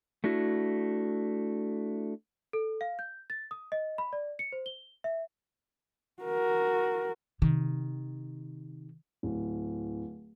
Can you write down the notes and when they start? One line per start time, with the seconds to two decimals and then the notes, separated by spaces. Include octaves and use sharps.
0.24 A3 D4 E4 F#4
2.53 A4
2.81 F5
2.99 G6
3.30 A6
3.51 D#6
3.72 D#5
3.98 B5
4.13 D5
4.39 C#7
4.52 C5
4.66 G7
5.04 E5
6.23 F#4 A#4
7.42 C3 D#3
9.23 D1